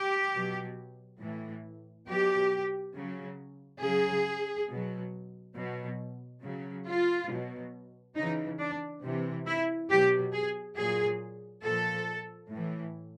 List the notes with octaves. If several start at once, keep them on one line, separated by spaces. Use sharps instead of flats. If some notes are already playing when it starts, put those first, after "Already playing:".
Already playing: G4
B2 F#3
A2 E3
B2 F#3 G4
C#3 F#3
C#3 F#3 G#4
B2 F#3
B2 F#3
C#3 F#3
F4
B2 F#3
C#3 E3 D#4
D4
C3 E3
E4
B2 F#3 G4
G#4
A#2 F#3 G#4
A#2 F3 A4
A2 E3